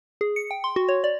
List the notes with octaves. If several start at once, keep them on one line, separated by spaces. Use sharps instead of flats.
G#4
C#7
G5
C6
F#4
C#5
D5